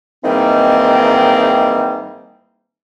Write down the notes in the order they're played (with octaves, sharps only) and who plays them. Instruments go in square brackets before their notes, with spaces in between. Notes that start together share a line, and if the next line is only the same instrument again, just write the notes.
[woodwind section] G#2 D#3 E3 G3 A#3 C4